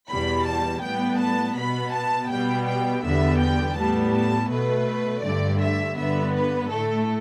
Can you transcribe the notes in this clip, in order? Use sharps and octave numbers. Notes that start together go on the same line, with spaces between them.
E2 B2 G3 B5
A5
A2 G3 B3 G5
A5
B2 B3 B5
A5
B2 G3 B3 G5
G5
E2 D3 G3 B3 E5
G5
A2 G3 B3 A5
A5
B2 A3 B4
G2 D3 A3 D5
E5
G2 D3 B3 E5
B4
A2 A3 A4